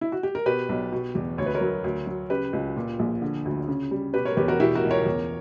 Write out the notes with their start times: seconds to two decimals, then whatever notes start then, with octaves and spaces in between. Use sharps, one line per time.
0.01 E4
0.12 F#4
0.23 G4
0.35 A#4
0.46 B2 G4 B4
0.69 B1
0.92 B2
1.15 E2
1.38 D2 C#5
1.46 B4
1.54 A#4 C#5
1.61 F#3
1.84 D2
2.07 F#3
2.30 C#3 G4 B4
2.53 C#2
2.76 A#2
2.99 A#1
3.22 D3
3.45 D2
3.68 C#3
3.91 G3
4.14 B2 G4 B4
4.25 A#4 C#5
4.37 E2 G4 B4
4.48 F#4 A#4
4.60 B2 E4 G4
4.75 F#4 A#4
4.84 C#2
4.91 A#4 C#5
5.06 E2